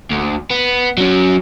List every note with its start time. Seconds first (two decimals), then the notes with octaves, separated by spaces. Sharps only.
0.10 D2
0.50 B3
0.98 F#3 C#4